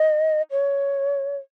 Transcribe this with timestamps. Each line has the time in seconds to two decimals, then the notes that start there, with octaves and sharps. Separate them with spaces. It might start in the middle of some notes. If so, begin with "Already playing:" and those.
Already playing: D#5
0.51 C#5